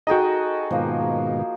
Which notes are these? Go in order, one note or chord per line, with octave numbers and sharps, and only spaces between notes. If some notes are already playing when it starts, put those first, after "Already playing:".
D#4 F#4 G#4 A4 D#5 G5
G#2 B2 D#3 F3 A#3